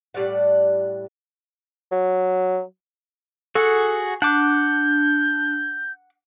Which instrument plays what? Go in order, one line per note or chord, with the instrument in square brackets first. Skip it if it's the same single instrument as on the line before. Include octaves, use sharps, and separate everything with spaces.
[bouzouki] A2 G3 D5 F#5
[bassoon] F#3
[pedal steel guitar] F#4 G#4 F#5 [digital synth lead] A4
[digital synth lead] D4 [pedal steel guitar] F#5 D6 [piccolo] G6